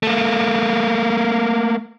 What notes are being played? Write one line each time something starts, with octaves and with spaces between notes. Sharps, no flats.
A3 A#3